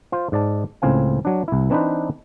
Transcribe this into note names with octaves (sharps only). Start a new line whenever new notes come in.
F4 C5
G#2 D5 A5
C#2 A2 C4 F5 G#5
F#3 D4
C2 E4
E3 C4 D4 D#4 B4 C5